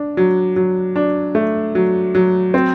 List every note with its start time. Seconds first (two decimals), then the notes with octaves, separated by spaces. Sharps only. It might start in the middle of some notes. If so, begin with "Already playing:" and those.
Already playing: D4
0.17 F#3
0.56 F#3
0.96 D4
1.35 A3
1.75 F#3
2.15 F#3
2.54 C4